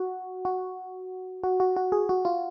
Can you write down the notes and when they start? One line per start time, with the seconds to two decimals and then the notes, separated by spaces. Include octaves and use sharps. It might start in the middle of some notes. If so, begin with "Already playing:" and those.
Already playing: F#4
0.45 F#4
1.43 F#4
1.60 F#4
1.76 F#4
1.92 G#4
2.09 F#4
2.25 F4